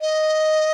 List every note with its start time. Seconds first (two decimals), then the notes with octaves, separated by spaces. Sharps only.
0.01 D#5